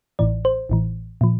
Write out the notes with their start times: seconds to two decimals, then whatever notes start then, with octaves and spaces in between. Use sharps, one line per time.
0.19 A1 A2 E3 D5
0.45 C5
0.69 A1 A2 E3
1.21 A#2 F3